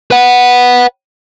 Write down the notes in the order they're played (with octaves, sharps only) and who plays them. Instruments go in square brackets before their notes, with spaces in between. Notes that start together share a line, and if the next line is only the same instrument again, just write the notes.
[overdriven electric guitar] B4 F#5